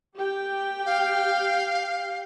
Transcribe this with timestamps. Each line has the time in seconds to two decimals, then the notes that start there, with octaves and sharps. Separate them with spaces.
0.17 G4 G5
0.86 F5